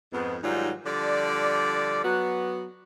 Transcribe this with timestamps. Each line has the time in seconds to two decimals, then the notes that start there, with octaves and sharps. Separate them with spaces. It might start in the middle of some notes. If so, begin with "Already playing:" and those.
0.12 F2 G#2 B3
0.43 G#2 D#3 F#3 G3 D#4 F4
0.86 D3 F3 G3 D5
2.04 F#3 B3 F#4